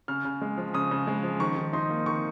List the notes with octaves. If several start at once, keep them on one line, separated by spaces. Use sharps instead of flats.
C#3 F6
C#3
G#3
F3
C#3 D#6
C#3
G#3
F3
D#3 C#6
D#3
D#4 C6
A#3
D#3 C#6